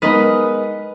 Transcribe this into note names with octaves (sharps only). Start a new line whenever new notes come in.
G#3 B3 D#4 A#4 B4 D#5